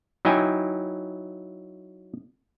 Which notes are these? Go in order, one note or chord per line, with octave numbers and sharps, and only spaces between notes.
F#3 D#4 E4 G5 G#5